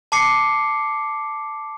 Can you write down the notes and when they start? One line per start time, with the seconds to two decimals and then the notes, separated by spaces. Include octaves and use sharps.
0.12 A5 D6 C7 C#7